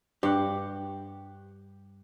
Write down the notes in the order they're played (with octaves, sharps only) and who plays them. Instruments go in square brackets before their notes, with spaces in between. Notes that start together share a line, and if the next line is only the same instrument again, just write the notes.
[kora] G2 F#5 [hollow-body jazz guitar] G4